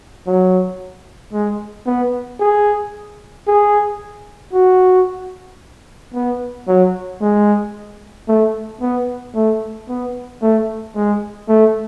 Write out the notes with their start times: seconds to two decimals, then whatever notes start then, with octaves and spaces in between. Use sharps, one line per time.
0.27 F#3
1.33 G#3
1.86 B3
2.40 G#4
3.47 G#4
4.54 F#4
6.14 B3
6.68 F#3
7.21 G#3
8.28 A3
8.81 B3
9.35 A3
9.88 B3
10.42 A3
10.96 G#3
11.49 A3